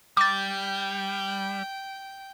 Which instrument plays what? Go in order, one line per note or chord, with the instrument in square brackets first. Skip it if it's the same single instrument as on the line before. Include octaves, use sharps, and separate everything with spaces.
[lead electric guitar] G3 [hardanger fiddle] G5 [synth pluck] D6 A6